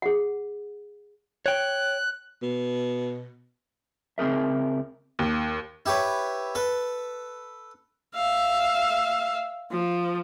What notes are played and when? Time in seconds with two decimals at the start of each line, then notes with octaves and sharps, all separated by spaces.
0.02 G#4 F#5
1.46 C#5 G5 F#6
2.42 B2
4.18 C#2 C4 G#4 A#4 E5
5.19 D#2
5.86 E4 G4 B4 C#5
6.55 A4 B4
8.15 E5 F5
9.71 F3